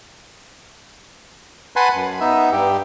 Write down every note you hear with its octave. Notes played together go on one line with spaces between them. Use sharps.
B4 F#5 G#5 A5 B5 C6
F#2
B3 D#4 E5
G2 G4